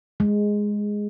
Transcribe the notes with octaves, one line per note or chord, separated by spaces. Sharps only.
G#3